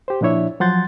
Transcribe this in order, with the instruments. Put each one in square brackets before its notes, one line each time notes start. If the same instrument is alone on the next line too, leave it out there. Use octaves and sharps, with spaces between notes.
[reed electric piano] G4 C5
A#2 F3 D4 E4 C#5 E5
F3 F#3 F#5 C6 G6 A6